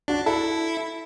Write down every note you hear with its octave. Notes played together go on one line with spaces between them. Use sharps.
D4 F#4
E4 A4